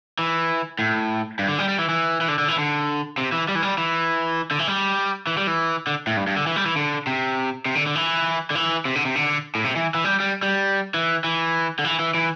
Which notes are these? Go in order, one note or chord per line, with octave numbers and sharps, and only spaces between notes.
E3
A2
G2
D3
G3
G3
E3
E3
E3
D3
D3
E3
D3
C3
E3
G3
E3
G3
E3
D3
E3
G3
E3
G3
E3
D3
A2
G2
G2
D3
E3
G3
E3
D3
C3
C3
D3
D3
E3
D3
E3
C3
D3
C3
D3
A2
C3
E3
E3
G3
G3
G3
E3
E3
D3
E3
E3
E3